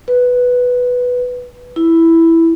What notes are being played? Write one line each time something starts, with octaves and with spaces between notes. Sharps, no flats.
B4
E4